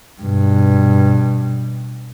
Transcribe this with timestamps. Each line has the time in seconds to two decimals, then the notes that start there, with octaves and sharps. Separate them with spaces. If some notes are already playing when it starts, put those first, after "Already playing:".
0.22 G2 B2